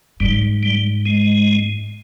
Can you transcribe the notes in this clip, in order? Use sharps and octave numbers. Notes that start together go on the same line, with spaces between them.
G#2 G3
G3
G#3